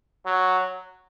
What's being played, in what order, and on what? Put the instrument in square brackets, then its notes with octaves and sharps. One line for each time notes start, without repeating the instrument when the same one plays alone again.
[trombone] F#3